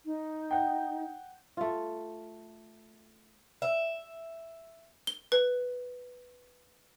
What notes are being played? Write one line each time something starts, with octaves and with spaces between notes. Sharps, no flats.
D#4
F#5 G5
A3 F4
E5
G7
B4